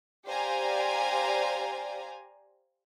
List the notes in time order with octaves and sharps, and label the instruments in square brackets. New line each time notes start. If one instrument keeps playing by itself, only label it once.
[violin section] G4 C5 D5 F5 G#5 A#5